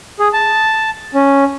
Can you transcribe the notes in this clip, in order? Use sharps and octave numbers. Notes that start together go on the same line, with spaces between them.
G#4
A5
C#4